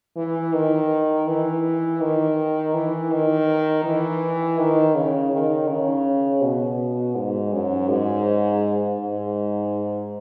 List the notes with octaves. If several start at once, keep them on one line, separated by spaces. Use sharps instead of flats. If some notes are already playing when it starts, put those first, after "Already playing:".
E3
D#3
E3
D#3
E3
D#3
E3
D#3
C#3
D#3
C#3
B2
G#2
F#2
G#2
G#2